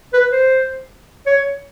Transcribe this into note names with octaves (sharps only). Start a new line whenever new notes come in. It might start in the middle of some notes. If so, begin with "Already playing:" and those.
B4
C5
C#5